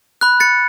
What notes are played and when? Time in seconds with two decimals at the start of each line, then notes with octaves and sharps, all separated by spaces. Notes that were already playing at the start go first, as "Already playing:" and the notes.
0.21 B5 F#6
0.40 A6 C#7